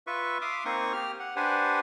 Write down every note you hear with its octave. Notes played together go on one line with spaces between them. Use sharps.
F4 B4 E5 C#6
E5 F5 C6 D6 D#6
A#3 C4 D#4 C#6 D#6
G4 F6
F#5
D4 G4 B4 C5 F#5 G#5